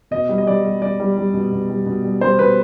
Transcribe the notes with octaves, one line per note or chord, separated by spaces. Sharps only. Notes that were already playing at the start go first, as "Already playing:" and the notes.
B2 D#5
G3
D#5
G3 D5
G3
G3 D5
G3
G3
B2
B2
G3
B2
G3
G3 C5
B2 B4